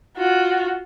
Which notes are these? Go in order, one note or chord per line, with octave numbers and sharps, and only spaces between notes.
F4 F#4